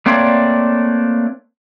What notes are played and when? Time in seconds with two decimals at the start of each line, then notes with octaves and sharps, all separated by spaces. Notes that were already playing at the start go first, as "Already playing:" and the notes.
0.06 A3 A#3 C4 D4 C#5 D5